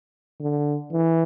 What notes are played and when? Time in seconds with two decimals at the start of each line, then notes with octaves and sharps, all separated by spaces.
0.40 D3
0.92 E3